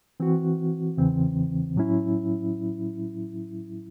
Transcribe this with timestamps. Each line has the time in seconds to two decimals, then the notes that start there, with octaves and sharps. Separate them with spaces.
0.20 E3 C4 F#4
0.97 E2 C#3 E3 C4
1.76 A2 F#3 C#4 E4